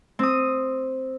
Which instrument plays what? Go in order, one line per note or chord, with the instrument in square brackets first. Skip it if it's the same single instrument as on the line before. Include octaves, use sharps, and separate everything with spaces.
[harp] C4 D#6